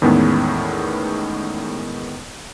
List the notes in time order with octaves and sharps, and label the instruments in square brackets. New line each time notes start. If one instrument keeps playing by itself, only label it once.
[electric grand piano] E2 A2 D#3 G#3 B3 C#4